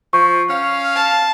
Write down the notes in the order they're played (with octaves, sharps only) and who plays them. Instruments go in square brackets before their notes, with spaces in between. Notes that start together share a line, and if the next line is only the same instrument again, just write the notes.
[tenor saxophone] F3 [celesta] C#6
[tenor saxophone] C#4 [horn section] F5
[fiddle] A5